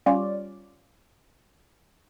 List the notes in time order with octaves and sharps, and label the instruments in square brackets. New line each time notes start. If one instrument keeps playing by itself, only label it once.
[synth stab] G3 C#4 F4 D5